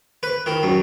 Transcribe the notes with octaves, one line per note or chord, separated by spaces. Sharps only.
B4
D#3
F#2